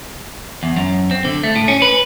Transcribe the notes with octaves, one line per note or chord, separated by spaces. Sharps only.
E2
F#2
C4
D3
A3
A2
C#4
B4